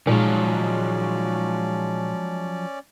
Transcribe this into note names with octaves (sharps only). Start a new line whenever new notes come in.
A#2 F3 F#3 G#3 C#4 D#4 D5